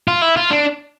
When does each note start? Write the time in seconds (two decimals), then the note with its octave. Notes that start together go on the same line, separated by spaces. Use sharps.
0.08 F4
0.22 E4
0.36 F4
0.50 D4